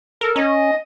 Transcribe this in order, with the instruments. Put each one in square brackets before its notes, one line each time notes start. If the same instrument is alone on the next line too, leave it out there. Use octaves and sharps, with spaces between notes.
[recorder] A4 [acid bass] A#4
[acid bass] C#4 [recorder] D#5